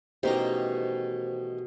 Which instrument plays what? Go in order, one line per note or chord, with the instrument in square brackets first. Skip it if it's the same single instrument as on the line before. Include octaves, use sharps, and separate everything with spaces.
[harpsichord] A1 D#3 A#5 [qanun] B2 A#4 [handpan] G4 [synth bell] C5